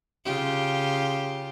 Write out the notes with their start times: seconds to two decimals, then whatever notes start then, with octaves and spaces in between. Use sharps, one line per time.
0.25 C#3 F4 G4